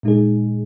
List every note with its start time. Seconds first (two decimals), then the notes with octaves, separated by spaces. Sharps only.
0.03 A#2 G#3 D#4 G#4